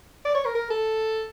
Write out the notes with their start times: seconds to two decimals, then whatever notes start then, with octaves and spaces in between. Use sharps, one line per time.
0.25 D5
0.35 C#5
0.45 A#4
0.55 A#4
0.70 A4